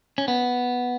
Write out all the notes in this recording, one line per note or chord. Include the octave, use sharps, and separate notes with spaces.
C#4
B3